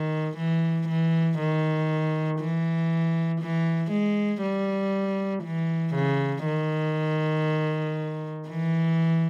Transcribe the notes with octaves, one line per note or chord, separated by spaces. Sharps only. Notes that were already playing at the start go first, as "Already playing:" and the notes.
Already playing: D#3
E3
E3
D#3
E3
E3
G#3
G3
E3
C#3
D#3
E3